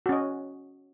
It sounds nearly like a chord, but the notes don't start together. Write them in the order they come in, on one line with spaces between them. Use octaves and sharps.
F#4 C#4 D#5